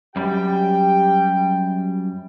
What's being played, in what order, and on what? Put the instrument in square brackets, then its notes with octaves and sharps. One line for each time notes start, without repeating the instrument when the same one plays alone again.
[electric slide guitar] F#2 G3 [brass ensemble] G4 G5